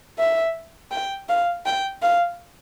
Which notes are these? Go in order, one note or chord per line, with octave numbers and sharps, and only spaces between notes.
E5
G5
F5
G5
F5